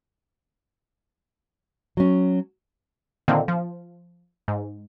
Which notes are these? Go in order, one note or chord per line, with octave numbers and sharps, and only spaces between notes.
F#3 C#4
A#2 D3 D#3 A#3 C4
F3
G#2